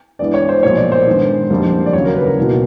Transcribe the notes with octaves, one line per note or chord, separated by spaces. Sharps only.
G2 E3 G#3 B3 D5
C#5
C5
B1 A#2 F3 A#3 C#5
D5
C5
G2 D#3 G#3 B3
F#1 F2 D3 G3 A#3
D5
D#2 C#3 F#3 C#5
A#4
B4
A#4
B1 B2 F#3 A#3